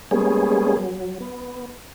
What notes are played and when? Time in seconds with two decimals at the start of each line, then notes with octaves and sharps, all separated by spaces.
0.11 G3 G#3 A#3 B3 C#4 G#4
0.79 F#3
1.20 B3